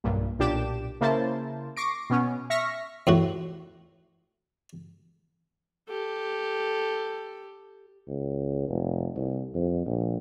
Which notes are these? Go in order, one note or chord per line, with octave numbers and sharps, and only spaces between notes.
B1 G2 A#2
B1 A#2 D4 G4 D6 E7
C#3 A#3 E4 A#4 C5 A5
C#6 D6 A#6 C7 D7
B2 B3 C#4
E5 C#6 F6 A#6 B6
E2 A2 F#4
G4 A4
C#2
F1
C2
F2
A#1